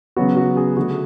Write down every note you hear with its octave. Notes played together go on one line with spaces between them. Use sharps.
C#3 F#3 B3 F#4
F#4
G#4
D3 A3 F#4